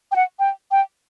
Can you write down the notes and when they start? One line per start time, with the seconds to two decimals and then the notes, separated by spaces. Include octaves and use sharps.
0.12 G5
0.16 F#5
0.39 G5
0.71 G5